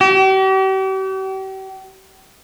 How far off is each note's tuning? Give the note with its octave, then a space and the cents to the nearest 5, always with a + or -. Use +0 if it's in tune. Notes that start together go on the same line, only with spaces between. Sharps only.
G4 -40